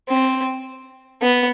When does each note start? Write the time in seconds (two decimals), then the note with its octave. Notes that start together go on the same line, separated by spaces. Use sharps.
0.09 C4
1.22 B3